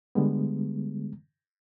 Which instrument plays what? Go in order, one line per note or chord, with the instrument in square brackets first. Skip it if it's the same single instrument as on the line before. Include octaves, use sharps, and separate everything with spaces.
[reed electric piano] D3 G3 G#3 B3